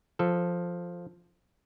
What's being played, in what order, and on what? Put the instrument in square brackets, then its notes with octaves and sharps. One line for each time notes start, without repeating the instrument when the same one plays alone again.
[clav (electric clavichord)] F3 A4